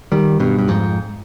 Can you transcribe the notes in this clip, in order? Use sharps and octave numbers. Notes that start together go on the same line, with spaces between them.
D#3 G3
G2 B2
G2
F2 G#2